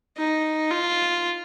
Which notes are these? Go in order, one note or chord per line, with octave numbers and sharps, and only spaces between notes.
D#4
F4